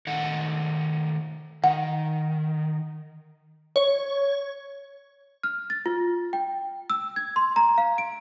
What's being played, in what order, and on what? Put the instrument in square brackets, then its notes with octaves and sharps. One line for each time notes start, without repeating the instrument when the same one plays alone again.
[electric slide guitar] D#3 A3 F#5
[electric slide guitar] D#3 [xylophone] F#5
[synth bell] C#5
[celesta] F6
A6
F4
G5
E6
G#6
C6
A#5
F5
D7